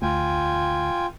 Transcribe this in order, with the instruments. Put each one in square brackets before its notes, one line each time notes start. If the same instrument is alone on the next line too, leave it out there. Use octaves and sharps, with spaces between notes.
[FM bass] D2 [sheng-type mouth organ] F4 G5 G#5